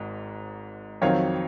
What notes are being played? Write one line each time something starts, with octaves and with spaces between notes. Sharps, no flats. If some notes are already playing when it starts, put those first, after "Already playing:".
Already playing: G#1 G#2
F2 D#3 F#3 C4 C#5 F5